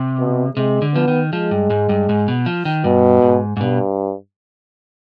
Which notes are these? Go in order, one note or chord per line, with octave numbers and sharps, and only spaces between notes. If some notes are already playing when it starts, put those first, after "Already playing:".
Already playing: C3
B2
C3 G#3
D3
F3 B3
D#3
F3 G#3
G2
G#2
G2
G#2
B2
F3
D#3
G2 B2
G#2
G#2
G2 B2